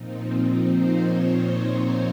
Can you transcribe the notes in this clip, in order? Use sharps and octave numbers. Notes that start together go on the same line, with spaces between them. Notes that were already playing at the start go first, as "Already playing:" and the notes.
Already playing: A#2 F3 C4 D#4
D#4
C5
C#5
C#5